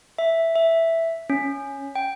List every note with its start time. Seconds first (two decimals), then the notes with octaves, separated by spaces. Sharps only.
0.18 E5
0.56 E5
1.30 C#4
1.96 G5